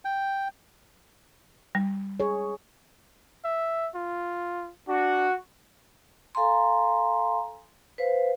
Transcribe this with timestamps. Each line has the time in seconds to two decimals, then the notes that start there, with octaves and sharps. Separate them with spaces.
0.05 G5
1.75 G3
2.20 G#4 C#5
3.45 E5
3.95 F4
4.88 D4 F#4
6.35 A4 F5 G#5 A#5 C6
7.98 B4 C5 F5